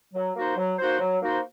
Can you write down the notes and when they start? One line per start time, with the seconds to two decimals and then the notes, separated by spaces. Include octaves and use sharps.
0.14 F#3
0.36 A#3 D#4 F#4 C5
0.57 F#3
0.79 A#3 D#4 F#4 C5
1.00 F#3
1.22 A#3 D#4 F#4 C5